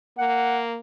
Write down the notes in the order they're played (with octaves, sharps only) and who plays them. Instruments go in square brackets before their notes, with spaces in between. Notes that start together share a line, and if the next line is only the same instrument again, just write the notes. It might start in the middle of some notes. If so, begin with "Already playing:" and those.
[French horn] A#3 [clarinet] F#5